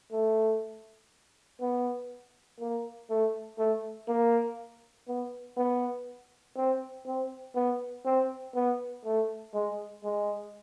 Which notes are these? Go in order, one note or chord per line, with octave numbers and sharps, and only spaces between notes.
A3
B3
A#3
A3
A3
A#3
B3
B3
C4
C4
B3
C4
B3
A3
G#3
G#3